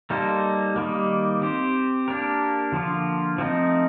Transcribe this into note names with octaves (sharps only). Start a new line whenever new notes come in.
G3 A#3 D#4 A4 C5
D#3 G3 A#3
C4 G4 C5
A#3 D4 G4 A#4
D3 F3 A#3 F4
F3 A3 C4 D#4